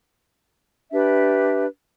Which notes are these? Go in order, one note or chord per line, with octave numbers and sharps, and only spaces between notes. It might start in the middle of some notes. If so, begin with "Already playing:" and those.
D4 G4 B4 E5